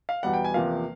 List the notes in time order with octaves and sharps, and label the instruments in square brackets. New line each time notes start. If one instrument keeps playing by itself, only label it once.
[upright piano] F5
E2 B2 G3 F#5
G5
G#5
E2 C3 F3 A#3 F5